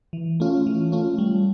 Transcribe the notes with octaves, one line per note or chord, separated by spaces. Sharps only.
E3
A3 C#4 F4
E3
A3 C#4 F4
G3